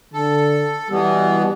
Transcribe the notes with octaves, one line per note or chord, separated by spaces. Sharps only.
D3 A4
B2 E3 G3 B3